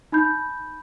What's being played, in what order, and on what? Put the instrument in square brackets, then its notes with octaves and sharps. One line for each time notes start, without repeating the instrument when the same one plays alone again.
[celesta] D#4 B5 G6